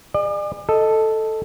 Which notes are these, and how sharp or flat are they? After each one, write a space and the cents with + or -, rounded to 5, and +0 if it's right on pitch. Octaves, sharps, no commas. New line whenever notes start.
G#4 -25 D5 +40
A4 +0 D#5 +0